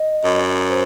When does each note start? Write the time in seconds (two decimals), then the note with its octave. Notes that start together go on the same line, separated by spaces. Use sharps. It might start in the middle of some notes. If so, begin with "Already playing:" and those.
Already playing: D#5
0.25 F#2
0.70 C5